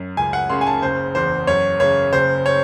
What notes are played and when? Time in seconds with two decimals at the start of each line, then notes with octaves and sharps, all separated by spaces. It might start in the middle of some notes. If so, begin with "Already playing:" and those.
Already playing: F#2
0.17 C#2 G#5
0.33 F#5
0.50 C#3 C6
0.61 G#5
0.67 A5
0.82 F#1 C5
1.15 E2 C5
1.47 F#2 C#5
1.80 C#3 C#5
2.12 F#1 C5
2.46 C#5